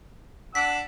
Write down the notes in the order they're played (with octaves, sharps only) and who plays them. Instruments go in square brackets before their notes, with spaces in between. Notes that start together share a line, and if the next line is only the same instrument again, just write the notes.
[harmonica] D4 F#5 E6 [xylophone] B6